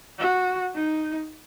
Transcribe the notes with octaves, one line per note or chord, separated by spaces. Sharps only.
F#4
D#4